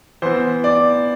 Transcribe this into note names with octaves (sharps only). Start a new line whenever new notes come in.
E3 B3 C5
D5